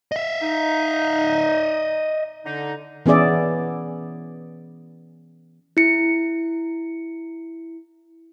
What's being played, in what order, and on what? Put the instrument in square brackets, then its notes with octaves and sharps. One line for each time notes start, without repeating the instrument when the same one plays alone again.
[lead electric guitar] D#5 E5
[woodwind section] D#4
D3 D#4
[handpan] E3 B3 C#4 G#4 D5 E5
[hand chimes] E4 C#7